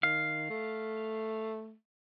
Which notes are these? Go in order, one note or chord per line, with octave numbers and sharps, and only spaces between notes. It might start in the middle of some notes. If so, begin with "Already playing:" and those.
D#3 F5
A3